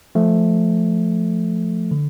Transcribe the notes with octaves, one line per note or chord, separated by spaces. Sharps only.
F3 A3
D3